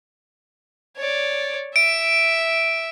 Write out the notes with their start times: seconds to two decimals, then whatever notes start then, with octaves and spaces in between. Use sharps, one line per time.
0.97 C#5 D5
1.76 E5 D7